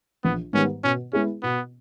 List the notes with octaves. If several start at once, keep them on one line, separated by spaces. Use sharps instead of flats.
A#1 B3
G#2 D#3 G3 B3 C#4
B2 C#4
G#3 B3 C#4 E4 G#4
B2 B3